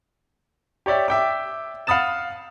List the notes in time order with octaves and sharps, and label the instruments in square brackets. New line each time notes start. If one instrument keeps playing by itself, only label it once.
[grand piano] G4 C#5 D5 E5 G5
E5 G5 D6
F5 F#5 B5 D#6 A6 E7